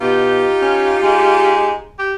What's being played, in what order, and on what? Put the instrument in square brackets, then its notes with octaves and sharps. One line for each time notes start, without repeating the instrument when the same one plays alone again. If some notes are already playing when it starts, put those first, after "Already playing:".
[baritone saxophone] B2 [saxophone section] D#4 F4 G4
[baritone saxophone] C#4
G#3
G4